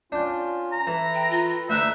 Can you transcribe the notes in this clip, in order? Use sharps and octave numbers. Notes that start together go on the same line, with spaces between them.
C#4 D4 F4 G5
A#5
E3 A4 B4
G5
F4
D2 D#4 E5 F#6